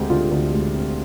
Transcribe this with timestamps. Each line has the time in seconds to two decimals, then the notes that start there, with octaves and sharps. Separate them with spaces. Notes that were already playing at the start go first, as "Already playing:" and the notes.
Already playing: D2 G#3 C4 G4
0.10 D3 F4
0.31 D2
0.53 G#3
0.74 C4